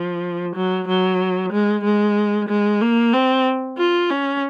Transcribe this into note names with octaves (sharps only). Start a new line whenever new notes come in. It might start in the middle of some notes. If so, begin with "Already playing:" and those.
Already playing: F3
F#3
F#3
G#3
G#3
G#3
A#3
C4
F4
C#4